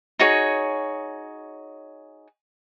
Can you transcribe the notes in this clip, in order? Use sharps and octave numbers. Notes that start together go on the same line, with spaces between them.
D#4 F#4 G#4 C#5